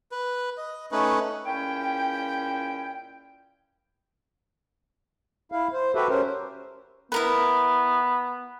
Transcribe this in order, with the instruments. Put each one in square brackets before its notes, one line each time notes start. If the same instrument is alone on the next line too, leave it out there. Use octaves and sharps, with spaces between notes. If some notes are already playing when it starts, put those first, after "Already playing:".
[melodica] B4
D#5
A3 C#4 D#4 B4
[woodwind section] C#2 A#2 C#4 E4 G5
[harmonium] E4 F5
C5
F#4 G4 A4 B4 E5
C#4 A#4 C5
[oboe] B3 [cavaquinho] E4 A#4 B4